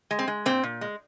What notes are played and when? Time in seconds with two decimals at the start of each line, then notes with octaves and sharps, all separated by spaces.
0.11 G#3
0.19 C4
0.28 G#3
0.46 A#2 C4
0.63 A#2
0.81 G#3